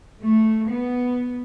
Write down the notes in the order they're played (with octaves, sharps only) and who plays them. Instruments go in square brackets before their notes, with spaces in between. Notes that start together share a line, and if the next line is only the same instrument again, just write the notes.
[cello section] A3
B3